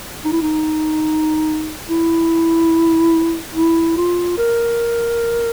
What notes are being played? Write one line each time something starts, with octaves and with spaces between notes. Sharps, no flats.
D#4
E4
D#4
E4
E4
F4
A#4